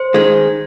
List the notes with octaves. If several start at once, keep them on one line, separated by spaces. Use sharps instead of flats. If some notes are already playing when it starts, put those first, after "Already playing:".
Already playing: C5
D#3 G#3